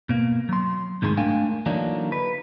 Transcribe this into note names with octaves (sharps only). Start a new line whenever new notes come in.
B2 A#3
F#3 C6
C2 G#2 D#3 G#3 B5 C6
A3 D4 A#4 F5 G5 G#5
D3 E3 F#3 A#3 D4 D#4
B4